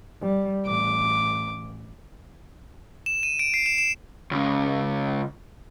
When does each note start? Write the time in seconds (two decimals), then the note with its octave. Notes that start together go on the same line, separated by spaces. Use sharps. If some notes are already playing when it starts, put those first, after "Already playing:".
0.21 G3
0.67 A1 D6
3.06 E7
3.23 D#7
3.39 D7
3.54 C7
3.66 E7
3.78 E7
4.31 C#2 C#3